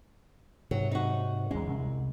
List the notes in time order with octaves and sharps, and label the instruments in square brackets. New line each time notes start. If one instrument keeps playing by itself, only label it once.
[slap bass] G#2 C3 [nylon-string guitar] F#3
[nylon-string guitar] D#4 F#4
[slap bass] E2 C#4 [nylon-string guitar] G#3
[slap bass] C2